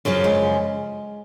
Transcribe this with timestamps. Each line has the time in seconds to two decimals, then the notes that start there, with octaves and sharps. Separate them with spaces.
0.05 F#2 C#3 F3 F#3
0.24 G#3